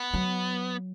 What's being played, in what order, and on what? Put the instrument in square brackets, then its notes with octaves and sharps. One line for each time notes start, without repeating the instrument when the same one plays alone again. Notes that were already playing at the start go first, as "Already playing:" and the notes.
Already playing: [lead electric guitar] B3
[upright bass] F#3